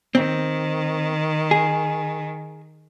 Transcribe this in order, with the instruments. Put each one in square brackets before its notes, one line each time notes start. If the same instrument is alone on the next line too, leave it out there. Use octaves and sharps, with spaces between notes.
[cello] D#3 [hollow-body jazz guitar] C4
[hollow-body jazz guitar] G#4